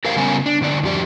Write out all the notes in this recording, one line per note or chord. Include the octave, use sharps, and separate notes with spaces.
G4 A#4 C5 F5
C#3 G3 B3 C#4 A#4 G#5
D4
G2 D3 D#4 D5
F2 G4 D5